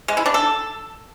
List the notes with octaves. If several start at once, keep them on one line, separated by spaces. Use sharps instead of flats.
G#3
E4
D4
A4